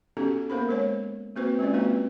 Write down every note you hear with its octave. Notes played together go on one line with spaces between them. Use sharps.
B3 C#4 D#4 F#4 G4 A4
A#3 B3 A#4 C5 B5
G#3 C5 C#5
A#3 C4 F#4 B4 C5
G#3 C#4 F4 D5
A#3 C4 D#4 F#4 B4